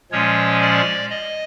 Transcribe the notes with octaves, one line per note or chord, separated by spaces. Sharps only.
A#2 F3 G#3 C#4 C#5
D5
D#5